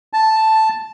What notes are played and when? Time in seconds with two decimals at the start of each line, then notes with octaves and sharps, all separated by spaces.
0.13 A5